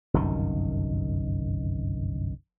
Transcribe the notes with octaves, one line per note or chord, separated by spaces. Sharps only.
G1 C2 F#2 D#3